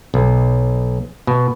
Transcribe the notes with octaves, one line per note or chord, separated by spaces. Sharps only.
B1
B2